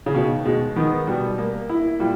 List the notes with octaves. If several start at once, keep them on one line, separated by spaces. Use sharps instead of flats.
C#3
B2 D#3
B2 G#3
D#3 B3
B2 G3
A#3
E4
A#2 G3